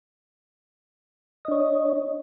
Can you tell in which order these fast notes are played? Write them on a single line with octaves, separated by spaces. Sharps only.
D#5 D4 C#5